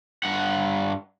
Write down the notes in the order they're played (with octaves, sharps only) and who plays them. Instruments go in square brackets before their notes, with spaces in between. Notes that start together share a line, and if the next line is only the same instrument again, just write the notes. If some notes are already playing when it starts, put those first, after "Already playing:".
[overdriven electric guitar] G2 F#5